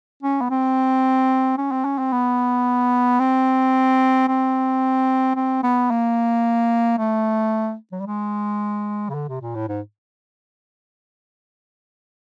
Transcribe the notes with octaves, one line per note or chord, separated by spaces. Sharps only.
C#4
B3
C4
C#4
C4
C#4
C4
B3
C4
C4
C4
B3
A#3
A3
F#3
G3
G#3
C#3
D3
C3
A#2
A2
G#2